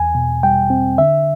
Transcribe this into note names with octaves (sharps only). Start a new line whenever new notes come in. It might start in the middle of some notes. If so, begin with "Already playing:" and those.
Already playing: E2 G#5
B2
G3 G5
C4
D3 E5